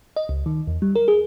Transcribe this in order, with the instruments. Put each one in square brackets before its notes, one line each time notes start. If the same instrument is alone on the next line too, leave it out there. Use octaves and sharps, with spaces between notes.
[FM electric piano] D#5
C#2
D#3
E2
G3
A#4
G#4